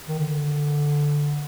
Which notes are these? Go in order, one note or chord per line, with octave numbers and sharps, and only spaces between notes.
D#3
D3